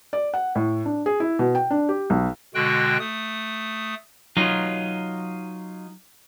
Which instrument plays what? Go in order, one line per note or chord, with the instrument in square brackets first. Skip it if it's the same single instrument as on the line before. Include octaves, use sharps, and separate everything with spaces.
[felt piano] D5
F#5
A2
D4
G#4
E4
B2
G5
D4
G4
B1
[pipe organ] B2 D3 G#3 F#4 G5 F#6
A3 D#6
[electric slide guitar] F#3 D#4 F4